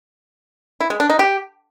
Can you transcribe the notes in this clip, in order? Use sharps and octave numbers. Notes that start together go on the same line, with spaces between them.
E4
G#3
D4
D#4
G4